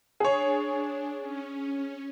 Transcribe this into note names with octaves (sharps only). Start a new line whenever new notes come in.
D4 G#4 C#5
C#4